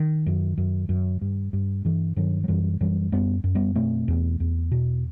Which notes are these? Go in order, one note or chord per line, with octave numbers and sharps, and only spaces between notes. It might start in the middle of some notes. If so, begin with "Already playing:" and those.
Already playing: D#3
F#2
F#2
F#2
G2
G2
G2 E3
G2 D#3 F#3
F#3
F#2 E3 G3
F#2 E3 G3
F#2 G3 B3
F#2
G3 B3
B2 A3 C4
E2
E2
B2